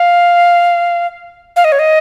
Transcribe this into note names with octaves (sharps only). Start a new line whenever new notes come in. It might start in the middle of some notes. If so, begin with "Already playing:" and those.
Already playing: F5
F5
D#5
C#5
D#5